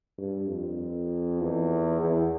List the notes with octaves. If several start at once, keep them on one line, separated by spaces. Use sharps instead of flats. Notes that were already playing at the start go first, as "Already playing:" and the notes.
G2
F2
E2
E2